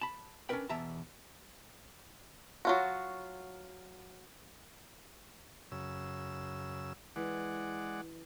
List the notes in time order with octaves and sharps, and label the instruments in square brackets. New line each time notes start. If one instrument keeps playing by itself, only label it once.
[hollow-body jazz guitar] A5 B5
C#4 D4 F#4 A#4 B4 G5
E2 B2 E5 A5 A#5
[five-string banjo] F#3 F4 F#4
[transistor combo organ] F#2 C#3 E6
[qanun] E3 [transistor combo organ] G#3 D5 F#5